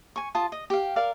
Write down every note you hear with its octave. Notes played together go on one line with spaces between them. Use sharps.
G#5 C#6
F4 A5 D#6
D#5
G4 F5
A#4 D5 F5